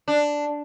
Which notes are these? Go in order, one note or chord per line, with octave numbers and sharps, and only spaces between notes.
D4